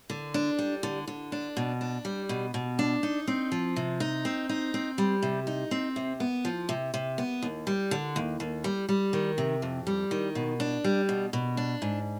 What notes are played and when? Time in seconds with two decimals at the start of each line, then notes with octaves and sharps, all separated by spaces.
0.10 D3
0.34 D4
0.59 G3
0.83 D3
1.08 D3
1.32 D4
1.57 B2
1.81 D4
2.05 G3
2.29 B2
2.54 B2
2.79 D4
3.03 D#4
3.28 C4
3.52 F3
3.76 C3
4.00 D#4
4.25 C4
4.49 D#4
4.74 C4
4.98 G3
5.22 C3
5.47 D#4
5.71 C4
5.96 C3
6.20 B3
6.45 F3
6.69 C3
6.94 C3
7.18 B3
7.43 D#2
7.67 G3
7.91 D3
8.16 D#2
8.40 D#2
8.64 G3
8.89 G3
9.13 D#3
9.38 C3
9.62 F2
9.87 G3
10.11 D#3
10.35 B2
10.60 D4
10.84 G3
11.09 B2
11.33 B2
11.57 D4
11.82 G#2